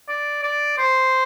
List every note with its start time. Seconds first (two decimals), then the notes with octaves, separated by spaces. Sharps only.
0.08 D5
0.43 D5
0.78 C5